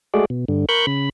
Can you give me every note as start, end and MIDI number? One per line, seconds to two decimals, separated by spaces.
0.14 0.25 56
0.14 0.25 57
0.14 0.25 66
0.14 0.25 68
0.14 0.25 74
0.30 0.45 47
0.48 0.66 43
0.48 0.66 50
0.69 0.86 70
0.69 0.86 83
0.69 0.86 85
0.69 0.86 90
0.69 0.86 91
0.87 1.09 49
0.87 1.09 83